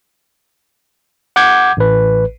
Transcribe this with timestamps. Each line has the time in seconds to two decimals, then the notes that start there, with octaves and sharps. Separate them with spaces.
1.36 F#5 D6 G6 G#6
1.77 A1 B4